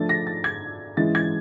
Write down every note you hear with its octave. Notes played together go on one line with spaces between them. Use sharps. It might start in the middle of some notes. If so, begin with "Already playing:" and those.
Already playing: F3 A3 D4 A6
A#6
A6
G#6
E3 G#3 C#4 E4 A6
G#6